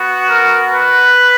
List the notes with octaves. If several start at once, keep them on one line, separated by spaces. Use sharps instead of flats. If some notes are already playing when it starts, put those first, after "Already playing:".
Already playing: B3 F#4
A#4
B4